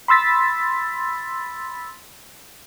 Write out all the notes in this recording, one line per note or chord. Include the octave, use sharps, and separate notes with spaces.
B5 C6 E6 A6 B6